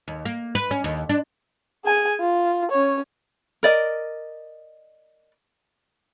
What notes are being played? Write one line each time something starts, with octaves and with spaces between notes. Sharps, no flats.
D#2
A#3
B4
C#4
D#2
D4
G#4 G#5
F4
C#4 C#5
A#4 D5 D#5